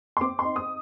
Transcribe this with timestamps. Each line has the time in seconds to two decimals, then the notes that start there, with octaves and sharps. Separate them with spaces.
0.17 C6
0.21 C4 D6
0.39 C6
0.45 D#4
0.56 D#6